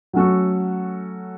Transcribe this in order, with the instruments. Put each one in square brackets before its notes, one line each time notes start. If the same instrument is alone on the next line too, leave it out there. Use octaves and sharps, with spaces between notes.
[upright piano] F#3 A3 C#4 F#4 A4